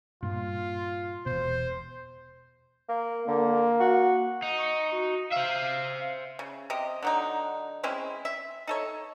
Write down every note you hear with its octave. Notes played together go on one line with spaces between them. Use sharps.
G2 A#2 F4
E1 B2 C5
A#3
D3 A#3
F#4
D#4
C#6
F#4
C5 E5 F5
C#3
C3 G4 D#5
D3 F#3 D#4
G#3 C4 C#4 E4
E5
D#4 A4 C#5